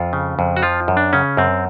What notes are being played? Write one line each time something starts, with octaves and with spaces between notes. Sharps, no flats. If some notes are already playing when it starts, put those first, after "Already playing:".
Already playing: F2 F4
C#3
F2
F#4
F3 F4
F#2
D4
C#3 C#4
F#2 C4